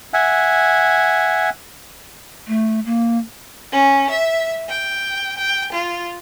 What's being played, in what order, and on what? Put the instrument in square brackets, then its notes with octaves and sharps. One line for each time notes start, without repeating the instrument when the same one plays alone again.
[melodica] E5 F#5 G#5
[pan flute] A3
A#3
[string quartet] C#4
E5
G5
G5
F4